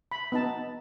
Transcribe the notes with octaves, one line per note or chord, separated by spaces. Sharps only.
B5
B3 D#4 A5